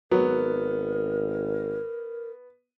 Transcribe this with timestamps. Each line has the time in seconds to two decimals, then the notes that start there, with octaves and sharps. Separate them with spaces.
0.11 G#1 F#3 B3 A#4